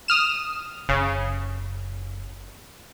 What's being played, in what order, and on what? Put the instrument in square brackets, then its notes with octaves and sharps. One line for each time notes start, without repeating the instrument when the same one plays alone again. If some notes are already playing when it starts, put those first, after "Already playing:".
[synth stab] D#6 F6 E7
[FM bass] F#1 [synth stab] C#3